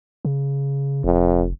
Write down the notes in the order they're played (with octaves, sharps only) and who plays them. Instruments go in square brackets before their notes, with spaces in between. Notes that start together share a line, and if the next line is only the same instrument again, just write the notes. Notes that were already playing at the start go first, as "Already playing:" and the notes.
[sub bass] C#3
[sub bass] F1 [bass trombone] F2